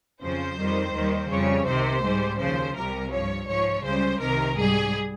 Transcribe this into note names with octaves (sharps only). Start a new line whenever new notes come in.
F2 C#3 F3 C5
F2 D#3 G3
D#2 D#3 G3
F2 C#3 G3 C#5
C2 C3 D#3 C5
G#2 G3
D#2 C#3 F3 C5
C2 C3 G3 A#4
G2 F3 C#5
G#2 F3 C#5
C#2 C#3 G3 C5
C2 C3 D#3 A#4
G#2 G3 G#4